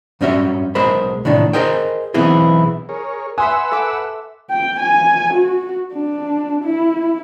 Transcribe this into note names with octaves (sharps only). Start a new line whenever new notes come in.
G2 G3 C#4 F#4 E5
B1 G#3 G#4 A#4 C5 B5
A2 C3 D#3 D4
G#4 A#4 C5 D#5 G5
B1 E3 B3 C4 E4 G#4
G#4 A#4 C#5
B4 E5 F#5 G#5 C6 D#6 E6
A4 E5 D6
G5
G#5
F#4
D4
E4